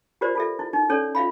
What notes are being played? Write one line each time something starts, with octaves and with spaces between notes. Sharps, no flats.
F4 G4 A#4 C5 D5
F4 A4 E5
E4
D#4
C#4 A4 C#5 D5
F4 E5 F5 B5